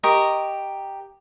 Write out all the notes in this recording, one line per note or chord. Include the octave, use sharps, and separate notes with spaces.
G4 A#4 D#5 C#6